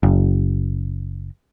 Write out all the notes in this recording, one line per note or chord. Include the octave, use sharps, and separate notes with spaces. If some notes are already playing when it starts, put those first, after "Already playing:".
F#1